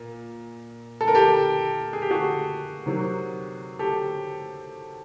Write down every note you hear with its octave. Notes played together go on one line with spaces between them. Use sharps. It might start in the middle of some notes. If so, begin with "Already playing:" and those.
Already playing: A#2
A4
A#4
G4 A4
G#4
G4
F#4 G#4
C3 D#3 F#3
G4 A4